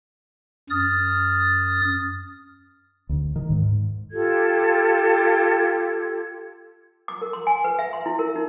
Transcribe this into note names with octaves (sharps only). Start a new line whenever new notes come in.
F#2 D#6 F6 A6
D2
D#3
G#2
F4 G4 A4 G#6
D6
A#4
C6
G#5
B4
E5
C6
E4
A#4
D#4